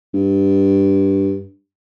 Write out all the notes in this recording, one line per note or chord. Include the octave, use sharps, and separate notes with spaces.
G2